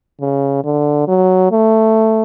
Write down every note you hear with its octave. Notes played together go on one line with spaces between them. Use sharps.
C#3
D3
F#3
A3